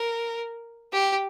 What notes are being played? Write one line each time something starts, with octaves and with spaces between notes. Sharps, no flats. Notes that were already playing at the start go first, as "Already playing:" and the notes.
Already playing: A#4
G4